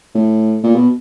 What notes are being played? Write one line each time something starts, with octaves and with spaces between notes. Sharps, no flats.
A2
A#2
B2